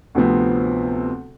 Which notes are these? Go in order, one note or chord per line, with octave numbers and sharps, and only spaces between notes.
D2 C3 F3 B3 C4